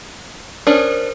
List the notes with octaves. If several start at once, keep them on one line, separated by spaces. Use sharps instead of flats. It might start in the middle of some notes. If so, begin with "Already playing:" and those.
C#4 D4 A#4 C5